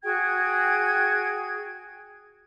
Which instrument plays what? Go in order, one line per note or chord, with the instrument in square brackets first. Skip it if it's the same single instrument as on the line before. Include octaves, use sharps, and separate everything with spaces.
[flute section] F#4 G#4 G5 G#6